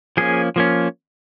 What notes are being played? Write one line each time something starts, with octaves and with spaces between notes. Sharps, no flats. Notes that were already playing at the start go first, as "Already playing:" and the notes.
F3 A#3 C#4 G#4
F3 A#3 C#4